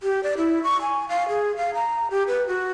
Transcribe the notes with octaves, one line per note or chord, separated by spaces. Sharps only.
G4
D5
E4
C#6
G#5
F5
G#4
F5
A#5
G4
B4
F#4